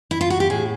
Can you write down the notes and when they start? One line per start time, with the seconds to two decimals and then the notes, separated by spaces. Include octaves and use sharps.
0.11 E4
0.21 F4
0.30 F#4
0.40 G4
0.50 A2 G#4